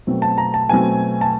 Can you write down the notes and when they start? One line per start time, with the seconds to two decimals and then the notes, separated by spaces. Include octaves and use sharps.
0.07 B2 F#3 A3 C4
0.22 A5
0.38 A#5
0.54 A5
0.69 B2 F#3 A3 C4 G#5
1.21 A5